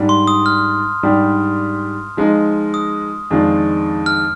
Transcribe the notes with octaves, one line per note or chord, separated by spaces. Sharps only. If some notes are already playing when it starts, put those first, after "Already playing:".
Already playing: G#2 G3 D4
C6
D#6
F6
G#2 G3 D4 G4
F3 G#3 D#4
D#6
F2 D#3 G#3 D4 F4
F6